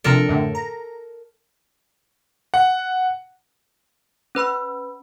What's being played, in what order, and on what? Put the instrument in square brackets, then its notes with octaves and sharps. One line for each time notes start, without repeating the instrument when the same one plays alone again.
[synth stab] C3 F3 D4 [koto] A4 A#4
[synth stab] F#2 A2 D3
A#5
[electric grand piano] F#5
[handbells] C#4 B4 B5 E6